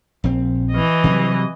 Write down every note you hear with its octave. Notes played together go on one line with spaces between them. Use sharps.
A#1 C4
E3 D#5
C3 F#3 G3